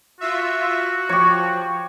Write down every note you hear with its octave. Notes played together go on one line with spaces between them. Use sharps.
F4 F#4 E5
F3 G4 C#5